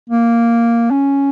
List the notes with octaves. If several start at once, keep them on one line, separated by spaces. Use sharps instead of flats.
A#3
C#4